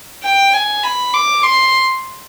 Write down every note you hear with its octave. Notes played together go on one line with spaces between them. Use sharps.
G5
G#5
B5
D6
C6